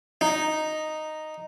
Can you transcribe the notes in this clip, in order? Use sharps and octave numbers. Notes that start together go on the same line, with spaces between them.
D#4